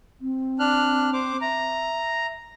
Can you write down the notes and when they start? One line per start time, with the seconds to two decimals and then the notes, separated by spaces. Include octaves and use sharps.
0.21 C4
0.59 D4 F6 F#6
1.13 C5 D6
1.41 E5 A#5